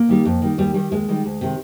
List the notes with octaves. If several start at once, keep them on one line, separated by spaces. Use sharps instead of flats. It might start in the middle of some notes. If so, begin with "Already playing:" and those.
Already playing: A#3
D#3 G3
F2
D#3 G3
D#2 G3
D#3 G3
D#2 G#3
D#3 G3
D2
C3 D#3